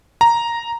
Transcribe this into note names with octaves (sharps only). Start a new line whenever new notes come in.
A#5